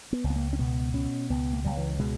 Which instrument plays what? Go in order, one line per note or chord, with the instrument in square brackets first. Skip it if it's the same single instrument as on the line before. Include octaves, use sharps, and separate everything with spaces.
[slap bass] B3
C#2
B3
A#3
C#4
B2 B3
B2 C#4
C#2 B3
A#3
C#2 G3
E3
B2 G#3